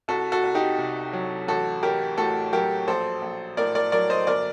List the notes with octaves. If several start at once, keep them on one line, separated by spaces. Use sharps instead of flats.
C2 F#4 A4
F#4 A4
C2
D#4 G4
C3
F#3
A1 F#4 A4
A1 G4 A#4
A2 F#4 A4
F#3 G4 A#4
A#1 A4 C5
A#1
A2 A#4 D5
A#4 D5
F#3 A#4 D5
C5 D#5
G1 A#4 D5